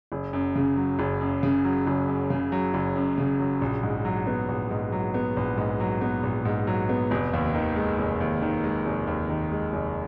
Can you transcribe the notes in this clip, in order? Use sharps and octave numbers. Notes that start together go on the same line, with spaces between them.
F#1
F#2
C#3
F#3
F#1
F#2
C#3
F#3
F#1
F#2
C#3
F#3
F#1
F#2
C#3
F#3
A#1
G#2
F#3
B3
A#1
G#2
F#3
B3
A#1
G#2
F#3
B3
A#1
G#2
F#3
B3
F1
D#2
D#3
G#3
F1
D#2
D#3
G#3
F1
D#2
D#3
G#3
F1